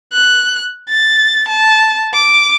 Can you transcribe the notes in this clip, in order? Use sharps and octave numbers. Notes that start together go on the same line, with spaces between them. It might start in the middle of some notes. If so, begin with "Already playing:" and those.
F#6
A6
A5
D6